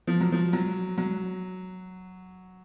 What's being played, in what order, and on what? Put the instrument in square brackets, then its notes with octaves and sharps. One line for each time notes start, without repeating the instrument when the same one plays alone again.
[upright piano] F3
F#3
F3
F#3
F#3